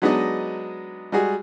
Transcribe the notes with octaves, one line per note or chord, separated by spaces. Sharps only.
F#3 G#3 B3 D4 D#4 D#5
G3 G#3 F#4 G#4